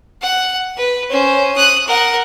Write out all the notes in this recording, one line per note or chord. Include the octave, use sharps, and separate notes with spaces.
F#5
B4
C#4 C5
D#6 F#6
A#4 F#5